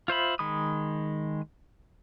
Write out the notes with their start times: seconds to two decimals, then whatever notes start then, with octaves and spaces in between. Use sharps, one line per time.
0.08 F4 C5 E5 B5
0.39 D#3 G#3 B5 D#6